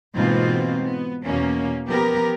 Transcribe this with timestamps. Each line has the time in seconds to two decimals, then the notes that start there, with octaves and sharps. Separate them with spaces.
0.16 G#2 B2 E3 A#3 C4 F4
0.82 B3
1.24 E2 B2 A#3 C#4
1.86 F3 B3 G4 A#4